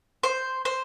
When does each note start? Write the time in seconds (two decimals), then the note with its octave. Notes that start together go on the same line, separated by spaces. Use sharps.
0.23 C5
0.65 C5